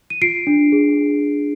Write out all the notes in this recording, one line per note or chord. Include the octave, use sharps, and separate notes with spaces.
D#7
F4 C7 D7
D4
G#4